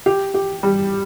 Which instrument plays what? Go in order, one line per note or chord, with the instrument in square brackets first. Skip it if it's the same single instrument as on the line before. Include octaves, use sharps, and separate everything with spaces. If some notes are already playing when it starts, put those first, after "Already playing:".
[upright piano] G4
G4
G3